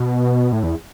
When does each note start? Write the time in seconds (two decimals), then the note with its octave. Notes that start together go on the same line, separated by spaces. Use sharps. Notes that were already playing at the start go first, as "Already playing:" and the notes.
Already playing: B2
0.52 A2
0.63 E2